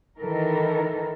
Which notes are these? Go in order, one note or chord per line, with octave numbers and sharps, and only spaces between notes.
D#3 E3 A4 A#4